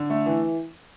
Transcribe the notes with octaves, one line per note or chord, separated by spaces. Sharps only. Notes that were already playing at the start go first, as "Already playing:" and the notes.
Already playing: D3
A3
E3